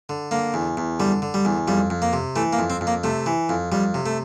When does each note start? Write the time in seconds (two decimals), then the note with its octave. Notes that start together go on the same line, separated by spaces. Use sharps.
0.09 D3
0.31 D3 A#3
0.54 E2
0.77 E2
1.00 D3 G3
1.22 D3
1.34 G3
1.45 E2
1.68 F2 G3
1.90 F2
2.02 A#3
2.13 C3
2.36 E3 A3
2.53 A#3
2.59 F2
2.70 C4
2.81 F2
2.87 A#3
3.04 C3 A3
3.26 E3
3.49 F2
3.72 F2 G3
3.94 C3
4.06 A3